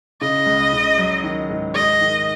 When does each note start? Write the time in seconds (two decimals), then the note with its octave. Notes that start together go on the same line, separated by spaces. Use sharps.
0.21 C#3 D#5
0.46 C#2
0.73 C#3
0.98 F#3
1.24 D#3
1.50 G#2
1.74 G#3 D#5
2.01 D#3